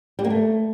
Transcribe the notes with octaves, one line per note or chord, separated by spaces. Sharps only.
G3
A#3
A3